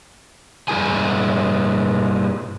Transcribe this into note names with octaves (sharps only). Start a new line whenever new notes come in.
G2 E3 E4 G#4 G#5